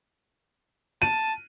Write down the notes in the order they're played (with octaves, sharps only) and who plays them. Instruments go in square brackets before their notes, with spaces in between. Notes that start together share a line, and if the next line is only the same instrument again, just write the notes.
[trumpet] A5 [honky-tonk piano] D#7